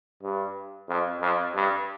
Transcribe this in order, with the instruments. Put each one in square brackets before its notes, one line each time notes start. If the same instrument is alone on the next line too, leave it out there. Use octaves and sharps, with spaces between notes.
[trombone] G2
F2
F2
G2